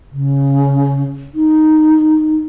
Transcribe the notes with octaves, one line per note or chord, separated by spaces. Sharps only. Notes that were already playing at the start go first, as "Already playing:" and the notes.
C#3
D#4